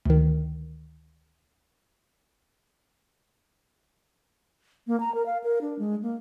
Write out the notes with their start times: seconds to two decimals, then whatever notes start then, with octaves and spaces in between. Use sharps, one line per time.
0.06 D2 D#3
4.87 A#3
5.00 A#5
5.15 A#4
5.26 F5
5.44 A#4
5.61 D4
5.79 G#3
6.02 A#3